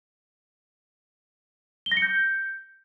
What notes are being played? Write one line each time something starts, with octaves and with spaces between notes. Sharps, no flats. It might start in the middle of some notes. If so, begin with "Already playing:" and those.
G7
A#6
C#7
G6